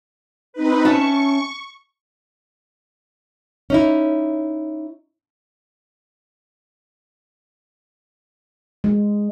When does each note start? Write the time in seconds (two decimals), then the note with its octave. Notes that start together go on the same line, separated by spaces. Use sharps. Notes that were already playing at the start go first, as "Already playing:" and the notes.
0.53 C4 D#4 B4
0.85 C#4 E5 A5 C#6
3.70 C#4 D#4 E4
8.84 G#3